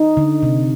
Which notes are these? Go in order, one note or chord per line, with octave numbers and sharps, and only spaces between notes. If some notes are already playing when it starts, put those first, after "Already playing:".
Already playing: D#4
D3
C3